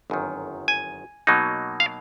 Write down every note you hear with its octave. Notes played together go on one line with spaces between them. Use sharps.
G1 F#2 D#3
G#5
B2 F#3 A#3 D#4
F5